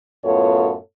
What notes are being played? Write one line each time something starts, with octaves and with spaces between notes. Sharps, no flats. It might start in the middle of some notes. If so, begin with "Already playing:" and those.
F#2 A2 B3 F4 A4 C#5